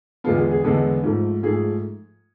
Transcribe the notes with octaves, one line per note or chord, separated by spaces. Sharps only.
E2 D3 G#3 B3 F4
G#4
G#4
E2 D3 G#3 B3 A4
G#2 F3 A3
G#2 F3 A3 G#4